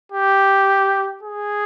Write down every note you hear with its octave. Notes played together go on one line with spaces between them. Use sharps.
G4
G#4